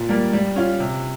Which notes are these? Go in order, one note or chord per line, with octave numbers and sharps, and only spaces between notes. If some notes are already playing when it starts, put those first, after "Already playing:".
Already playing: A#2
G3 A#3
G3
C#4 F4
C3